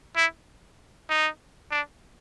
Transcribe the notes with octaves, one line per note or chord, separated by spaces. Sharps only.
E4
D#4
D4